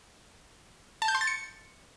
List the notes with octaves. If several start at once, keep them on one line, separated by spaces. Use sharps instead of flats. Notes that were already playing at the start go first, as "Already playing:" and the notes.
A5
G6
C6
A6
C#7